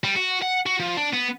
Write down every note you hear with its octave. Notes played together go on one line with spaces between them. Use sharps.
G3
F#4
F#5
F#4
F3
D4
B3